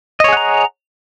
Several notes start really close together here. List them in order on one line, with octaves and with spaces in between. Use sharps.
D#5 C#5 G#4 F#5 A#5